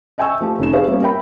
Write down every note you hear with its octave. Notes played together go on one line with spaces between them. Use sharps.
D#5 E5 G5 G#5 C#6 E6
F3 A3 G4
F1 C#4 D#4 E7
G4 G#4 B4 C#5 E5 F5
G3 A#3 B3 C#4
A#4 E5 G5 B5